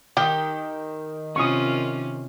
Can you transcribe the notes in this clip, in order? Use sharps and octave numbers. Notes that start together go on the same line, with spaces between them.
D#3 G4
C3 C#4 F4 C#6 D#6